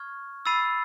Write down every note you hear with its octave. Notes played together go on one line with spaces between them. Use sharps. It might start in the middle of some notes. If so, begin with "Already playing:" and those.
Already playing: C#6 F6 G#6
B5 E6 A6 C7 D#7